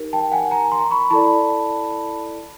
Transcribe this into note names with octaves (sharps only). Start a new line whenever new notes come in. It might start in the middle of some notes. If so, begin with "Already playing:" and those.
Already playing: D#4 G4 A#4
G5 A5
F#5 G#5
G#5 A#5
A#5 C6
B5 C#6
E4 A4 D5 A5 B5